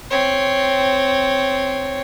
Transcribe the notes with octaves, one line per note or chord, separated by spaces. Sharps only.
C4 C#5